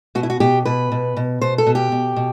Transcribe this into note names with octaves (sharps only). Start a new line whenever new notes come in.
B2 F#4
E4
F#4
B2 G4
B2 B4
B2
B2
B2 C5
A4
B2
G4
B2
B2